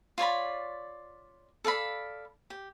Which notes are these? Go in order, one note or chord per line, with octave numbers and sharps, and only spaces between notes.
F4 C#5 D5 B5
A4 D5 F5 B5
G4